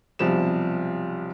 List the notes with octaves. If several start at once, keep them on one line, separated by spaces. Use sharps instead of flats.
B1 C3 F3 G3 E7